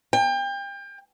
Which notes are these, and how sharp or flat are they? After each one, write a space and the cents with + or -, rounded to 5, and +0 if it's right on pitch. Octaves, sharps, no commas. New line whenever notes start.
G5 +30